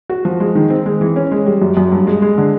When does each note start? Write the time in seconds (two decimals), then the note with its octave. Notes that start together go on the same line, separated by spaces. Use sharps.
0.10 F#4
0.25 F3
0.40 G#3
0.55 D#3
0.70 C4
0.86 G#3
1.01 E3
1.16 C#4
1.31 G#3
1.46 G3
1.62 F#2
1.77 F#2
1.92 G2
2.07 G#3
2.22 G#3
2.38 D3